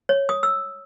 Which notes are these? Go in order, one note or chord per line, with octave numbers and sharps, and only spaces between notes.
C#5
D#6
E6